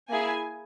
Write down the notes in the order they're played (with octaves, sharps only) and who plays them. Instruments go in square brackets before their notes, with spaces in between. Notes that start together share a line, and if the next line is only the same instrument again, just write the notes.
[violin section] A#3 E4 G#4 G#5